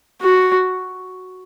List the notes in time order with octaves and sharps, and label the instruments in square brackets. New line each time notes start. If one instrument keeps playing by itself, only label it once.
[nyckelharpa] F#4